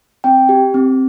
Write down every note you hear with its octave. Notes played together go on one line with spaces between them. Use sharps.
C4 G5
G4
C4